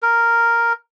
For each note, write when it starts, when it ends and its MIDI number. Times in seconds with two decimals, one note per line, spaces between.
0.03 0.73 70